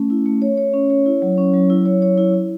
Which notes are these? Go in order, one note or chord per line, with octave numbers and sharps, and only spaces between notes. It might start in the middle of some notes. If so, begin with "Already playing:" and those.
Already playing: A3 C#4
E4
A3
C#5
C#5
C#4
C#5
E4
F#3
C#4
F#3
E4
C#5
C#5
E4
E4